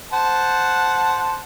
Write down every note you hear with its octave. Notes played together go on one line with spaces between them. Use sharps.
C5 F#5 A5